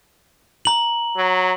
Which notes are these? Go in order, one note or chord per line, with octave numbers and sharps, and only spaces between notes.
A#5 F#7
F#3